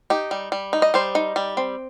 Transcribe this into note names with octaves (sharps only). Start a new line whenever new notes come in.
D#4 G4
G3
G3
D#4
D#5
G3 C5
D#4
G3
C4